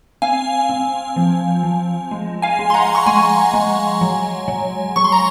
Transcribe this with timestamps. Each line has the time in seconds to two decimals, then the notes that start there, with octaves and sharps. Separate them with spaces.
0.22 C4 F5 G#5
0.69 C4
1.16 F3
1.63 F3
2.11 G#3
2.42 F5 G#5
2.59 G#3
2.70 C6
2.74 F#5 A#5
2.95 C#6
3.06 G#3 G#5 C6
3.54 G#3
4.01 F#3
4.48 F#3
4.96 F#3 C#6
5.04 C6
5.12 A#5